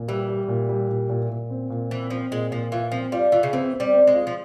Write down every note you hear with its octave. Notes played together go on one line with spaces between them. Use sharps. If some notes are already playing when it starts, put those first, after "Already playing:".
Already playing: A#2
E3 G3
G3
A#2
G3
A#2
A#2
A#2
C4
A#2
E3 C4
F3 C4
A#2 G#3
A#2 F3
E3 F4
F3 C4
G3 F4
E3 F4
C#3
E3 C4
C4
G3
C4
G#3
F4
F3